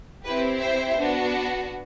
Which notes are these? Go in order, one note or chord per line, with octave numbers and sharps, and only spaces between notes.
C4 E4 G4 B4
C5 E5
B3 D4 F#4